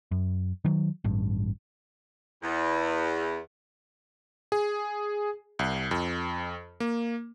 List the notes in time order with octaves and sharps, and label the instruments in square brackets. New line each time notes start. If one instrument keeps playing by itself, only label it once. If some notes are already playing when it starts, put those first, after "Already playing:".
[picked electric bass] F#2
D#3 F#3
A1 G2
[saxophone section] E2
[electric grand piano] G#4
C2
F2
A#3